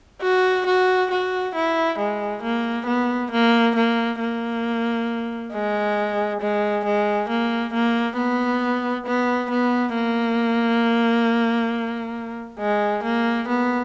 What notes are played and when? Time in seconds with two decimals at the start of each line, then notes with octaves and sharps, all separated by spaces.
0.22 F#4
0.66 F#4
1.11 F#4
1.55 E4
1.99 G#3
2.43 A#3
2.87 B3
3.31 A#3
3.76 A#3
4.20 A#3
5.53 G#3
6.41 G#3
6.85 G#3
7.29 A#3
7.74 A#3
8.18 B3
9.06 B3
9.51 B3
9.95 A#3
12.60 G#3
13.04 A#3
13.48 B3